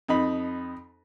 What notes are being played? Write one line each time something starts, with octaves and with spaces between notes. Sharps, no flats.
F2 D#4 B5